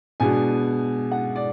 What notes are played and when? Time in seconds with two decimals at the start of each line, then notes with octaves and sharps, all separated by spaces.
0.20 B2 G#3 B3 D4 G#5
1.12 F#5
1.36 D5